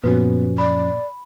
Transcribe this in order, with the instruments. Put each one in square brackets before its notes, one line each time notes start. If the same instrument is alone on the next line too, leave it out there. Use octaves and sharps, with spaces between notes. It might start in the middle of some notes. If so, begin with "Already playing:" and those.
[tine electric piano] F#2 F3 C#4 [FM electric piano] A#2 [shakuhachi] B3 [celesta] F#4 B4
[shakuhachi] D5 [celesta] B5